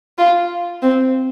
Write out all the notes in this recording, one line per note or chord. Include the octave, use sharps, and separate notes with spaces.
F4
C4